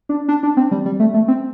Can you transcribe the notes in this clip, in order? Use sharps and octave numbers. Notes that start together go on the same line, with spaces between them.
D4
D4
D4
C4
G3
G3
A3
A3
C4